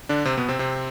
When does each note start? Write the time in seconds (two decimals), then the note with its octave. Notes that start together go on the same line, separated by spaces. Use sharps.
0.09 D3 D4
0.25 C3 C4
0.37 B2 B3
0.48 C3 C4
0.59 C3 C4